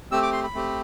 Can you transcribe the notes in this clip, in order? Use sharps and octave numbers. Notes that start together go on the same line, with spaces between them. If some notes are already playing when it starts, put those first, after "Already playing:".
A3 C4 G4 E6
D6
C6
B5
A3 C4 G4